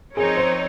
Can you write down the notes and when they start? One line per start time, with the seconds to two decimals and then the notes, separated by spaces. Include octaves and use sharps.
0.16 F3 C4 D#4 G#4 A#4 C#5
0.37 C5